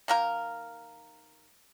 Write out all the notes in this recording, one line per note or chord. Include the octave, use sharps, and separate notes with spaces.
D#3 A#3 A#4